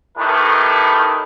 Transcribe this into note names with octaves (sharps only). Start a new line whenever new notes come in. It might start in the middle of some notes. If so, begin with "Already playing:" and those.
A2 D#3 A3 E4 G4 B4